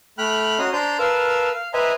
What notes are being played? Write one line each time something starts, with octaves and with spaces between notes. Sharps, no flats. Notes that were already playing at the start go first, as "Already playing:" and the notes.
A3 G5 B5 F6 F#6
C#4 F#4 D#5 A#5 C6
D4 C5 D5 A#5 C6 G6
A#4 B4 F5 A5 E6
F5
B4 C5 D#5 E5 G#5 A#5